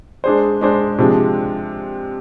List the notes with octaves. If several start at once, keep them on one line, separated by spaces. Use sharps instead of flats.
G#3 D4 G#4 C5
G#3 D4 G#4 C5
C3 F3 G#3 D4 G#4